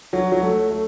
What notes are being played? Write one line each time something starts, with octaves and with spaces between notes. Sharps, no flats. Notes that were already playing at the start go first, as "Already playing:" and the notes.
F#3
F#3
A3
A3